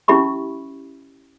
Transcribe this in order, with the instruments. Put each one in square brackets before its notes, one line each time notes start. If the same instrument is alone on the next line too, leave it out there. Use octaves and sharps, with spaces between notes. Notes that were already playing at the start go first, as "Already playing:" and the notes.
[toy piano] C#4 E4 G4 E5 B5 C#6